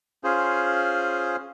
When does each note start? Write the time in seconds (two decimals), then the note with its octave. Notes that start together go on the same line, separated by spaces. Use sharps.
0.24 C#4 F4 G#4 C5